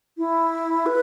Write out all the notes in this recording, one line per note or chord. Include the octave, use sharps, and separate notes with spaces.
E4
B4